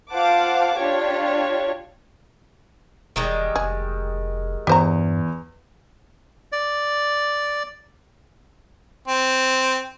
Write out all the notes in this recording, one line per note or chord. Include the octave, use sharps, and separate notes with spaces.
F4 C5 F5 F#5 A5 D6
D4 F4 G4 C#5
E1 D#3 G3 G#3
F1 G#4
E2 G2 G4 C5 A#5
D5
C4